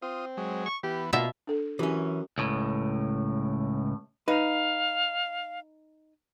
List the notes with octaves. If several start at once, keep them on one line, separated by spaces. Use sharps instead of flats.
C4 F4 D#6
F#3 G#3
C#6
E3 B3 G4
B2 A#3 F4 E5
D4 A4
F#2 E3 C#4 G4
C#2 A2
D#4 B4 F5